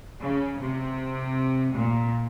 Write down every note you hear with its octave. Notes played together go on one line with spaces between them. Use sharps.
C#3
C3
A#2